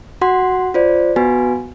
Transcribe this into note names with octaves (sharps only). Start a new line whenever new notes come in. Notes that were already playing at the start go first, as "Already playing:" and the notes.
F#4 F#5 C6
F4 C5 D5
B3 F#4 B4 G#5